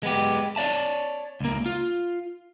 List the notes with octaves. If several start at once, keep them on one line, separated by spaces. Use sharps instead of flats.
G#3 B3 G4
C#5 D5 E5 A5
C#2 A#3
F4